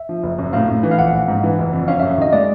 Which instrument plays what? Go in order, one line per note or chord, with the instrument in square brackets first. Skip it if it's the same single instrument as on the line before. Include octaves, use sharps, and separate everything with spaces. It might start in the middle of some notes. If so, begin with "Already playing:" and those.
Already playing: [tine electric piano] E5
[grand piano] F3
F#1
F#2
[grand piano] A2 [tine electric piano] F5
[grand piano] A2
E3
[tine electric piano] F5
[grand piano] A#1 [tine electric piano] F#5
[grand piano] A#1
G#2
E3
F#1
F2
[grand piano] C#4 [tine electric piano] F5
[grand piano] F#2 [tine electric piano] E5
[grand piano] D#3 [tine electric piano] D#5
[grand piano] G#3 [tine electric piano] D5